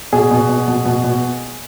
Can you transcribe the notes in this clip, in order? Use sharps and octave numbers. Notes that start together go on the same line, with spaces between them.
B2 G#4
B2
B2
B2
B2
B2